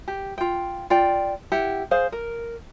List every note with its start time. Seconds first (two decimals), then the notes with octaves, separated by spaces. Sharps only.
0.08 G4
0.38 F4 G5
0.90 F4 D5 G5
1.52 E4 G4 F#5
1.91 G#4 C5 F5
2.12 A#4